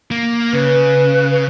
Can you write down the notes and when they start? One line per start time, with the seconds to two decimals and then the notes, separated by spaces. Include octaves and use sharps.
0.11 A#3
0.53 C#3 B4